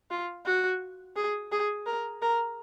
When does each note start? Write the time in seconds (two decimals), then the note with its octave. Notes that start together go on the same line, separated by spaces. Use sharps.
0.11 F4
0.46 F#4
1.16 G#4
1.52 G#4
1.86 A#4
2.22 A#4